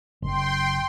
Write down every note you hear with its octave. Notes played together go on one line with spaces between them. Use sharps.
F#1 G5 C6